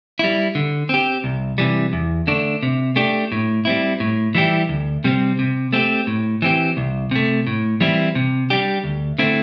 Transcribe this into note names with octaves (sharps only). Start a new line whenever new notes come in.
G3 E4
D3
C4 G4
C2
C3 E3 G3
E2
D3 A3 D4
C3
A3 D4 G4
A2
G3 C4 E4
A2
E3 G3 E4 G4
D2
C3 G3 C4
C3
A3 C4 G4
A2
E3 C4 G4
C2
C3 A3
A2
E3 G3 C4 E4
C3
G3 D4 G4
D2
D3 A3 C4 E4